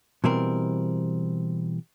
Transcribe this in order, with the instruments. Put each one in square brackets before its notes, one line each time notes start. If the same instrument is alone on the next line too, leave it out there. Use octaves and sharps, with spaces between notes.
[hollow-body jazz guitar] B2 E3 G3 C4 A#4